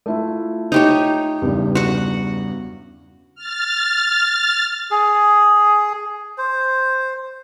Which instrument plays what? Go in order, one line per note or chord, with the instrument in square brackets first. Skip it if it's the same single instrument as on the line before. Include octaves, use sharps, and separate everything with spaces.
[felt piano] A3 E4 F4
[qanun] D#4 G4 C#5
[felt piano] E2 G2 C#3
[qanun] F#4 F#5
[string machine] F6 A6
[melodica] G#4
C5